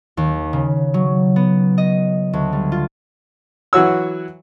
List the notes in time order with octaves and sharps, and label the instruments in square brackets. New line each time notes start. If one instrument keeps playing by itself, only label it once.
[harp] D#2
C#3
F#3
B3
D#5
D2
G3
F4
[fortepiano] E3 F#3 F#4 C#5 E6